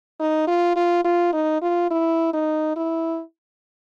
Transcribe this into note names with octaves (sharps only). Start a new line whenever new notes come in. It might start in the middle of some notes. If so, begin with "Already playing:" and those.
D#4
F4
F4
F4
D#4
F4
E4
D#4
E4